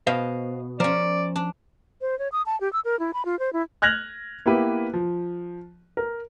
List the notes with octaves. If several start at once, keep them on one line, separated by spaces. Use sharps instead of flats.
B2 C5 D#5 F5
F3 C#4 A#4 C5 D5
D4
C5
C#5
D#6
A5
G4
E6
A#4
E4
B5
F4
C5
E4
F6 F#6 G#6 A#6 F7 F#7
A#3 B3 E4 G4 B4
F3
A#4